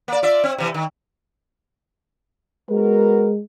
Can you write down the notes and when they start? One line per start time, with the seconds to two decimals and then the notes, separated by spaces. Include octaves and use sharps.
0.08 A#3 D5
0.23 F4 D5 E5
0.44 C4
0.58 C3 E3
0.74 D#3
2.70 G#3 B3 F#4 A#4